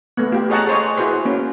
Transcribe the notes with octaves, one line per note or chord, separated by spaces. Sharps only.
A3 B3
F4 G4
G#4 C#5 D#5 F#5 A5 A#5
G#4 C5 C#5 D#5
E4 F#4 G#4 B4 C5
A#3 C#4